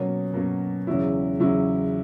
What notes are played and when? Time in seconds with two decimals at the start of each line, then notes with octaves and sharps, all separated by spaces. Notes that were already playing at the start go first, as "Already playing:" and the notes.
Already playing: B2 F#3 A#3 C#4
0.33 B2 F#3 A#3 C#4
0.87 E2 C#3 F#3 C#4 E4
1.40 E2 C#3 F#3 C#4 E4